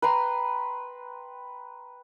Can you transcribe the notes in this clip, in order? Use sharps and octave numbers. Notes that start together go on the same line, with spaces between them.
B4 G5 A#5 C6